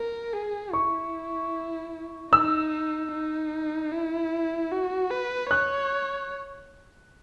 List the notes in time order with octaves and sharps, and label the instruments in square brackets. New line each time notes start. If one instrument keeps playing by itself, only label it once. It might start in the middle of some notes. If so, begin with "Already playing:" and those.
Already playing: [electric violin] A#4
G#4
[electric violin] E4 [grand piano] C#6
[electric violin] D#4 [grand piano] E6
[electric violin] D#4
E4
F#4
B4
[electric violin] C#5 [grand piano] F#6